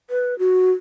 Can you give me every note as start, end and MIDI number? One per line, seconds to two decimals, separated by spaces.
0.10 0.37 71
0.39 0.72 66